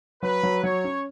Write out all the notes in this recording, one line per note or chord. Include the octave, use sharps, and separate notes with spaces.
F#3 B4
F#3
F#3 C#5
C#4